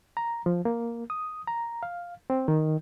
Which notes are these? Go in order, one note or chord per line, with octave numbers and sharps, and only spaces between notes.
A#5
F3
A#3
D#6
A#5
F5
C4
D#3